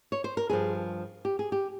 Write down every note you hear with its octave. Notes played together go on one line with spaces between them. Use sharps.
C#5
C5
A#4
G2 F3 G#4
G4
G#4
G4